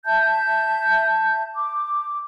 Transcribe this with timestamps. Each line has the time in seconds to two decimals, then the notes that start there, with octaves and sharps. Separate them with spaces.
0.06 E5 A5 G6
1.55 D6